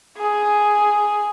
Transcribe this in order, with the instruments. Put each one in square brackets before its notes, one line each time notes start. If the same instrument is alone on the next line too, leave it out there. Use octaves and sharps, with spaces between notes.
[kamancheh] G#4